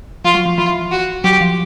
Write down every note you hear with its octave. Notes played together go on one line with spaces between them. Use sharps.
F3 F4
F#3
F3
E3 F4
F#4
F#3 G4
F3